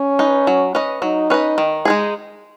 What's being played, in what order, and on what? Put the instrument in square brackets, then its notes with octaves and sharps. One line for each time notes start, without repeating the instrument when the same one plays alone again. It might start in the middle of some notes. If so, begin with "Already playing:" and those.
Already playing: [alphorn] C#4
[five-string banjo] D#4 B4
F#3
C#4 B4 D#5
[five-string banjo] F#3 [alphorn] D#4
[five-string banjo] C#4 B4 D#5
D#3
G#3 D#4 G#4